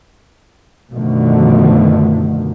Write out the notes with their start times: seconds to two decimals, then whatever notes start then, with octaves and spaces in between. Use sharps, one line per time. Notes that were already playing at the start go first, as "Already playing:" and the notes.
0.92 F#2 B2 D3 D#3 F3 A3